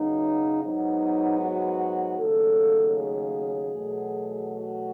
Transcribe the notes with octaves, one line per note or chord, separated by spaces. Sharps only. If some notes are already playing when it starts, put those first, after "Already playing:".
Already playing: F#2 C#3 F#3 B3 D#4
G#2 F#3 B3 D#4
F#4
D#2 C#3 F#3 A3 A4
G#4
E2 B2 F#3 A3
F#4